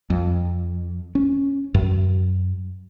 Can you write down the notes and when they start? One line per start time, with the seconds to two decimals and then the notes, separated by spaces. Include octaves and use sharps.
0.10 F2
1.15 C#4
1.74 F#2